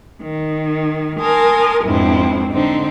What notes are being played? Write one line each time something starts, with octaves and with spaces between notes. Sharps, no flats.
D#3
A#4 G#5 A5 C6 D#6
F2 G#2 B2 C4 D4 E4
D3 C4 D#4